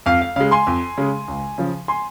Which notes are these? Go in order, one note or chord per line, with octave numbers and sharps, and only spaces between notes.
F2 F5
F5
C#3 G#3 F5
G#5 C6
F2
C#3 G#3
C#2
C#3 F3
G#5 C6